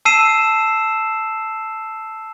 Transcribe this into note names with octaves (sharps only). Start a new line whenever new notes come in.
A5 E6 C7 D#7 E7